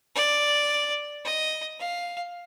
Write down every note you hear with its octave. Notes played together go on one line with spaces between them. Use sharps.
D5
D#5
F5